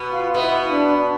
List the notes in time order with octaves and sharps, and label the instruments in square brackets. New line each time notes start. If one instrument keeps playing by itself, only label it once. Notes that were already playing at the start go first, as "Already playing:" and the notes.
Already playing: [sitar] B2 B3
[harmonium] F4
[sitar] B2 B3 [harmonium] E4
[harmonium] D4